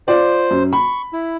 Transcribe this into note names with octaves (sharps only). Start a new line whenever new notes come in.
F4 C5 D5
F#2
B5 C#6
E4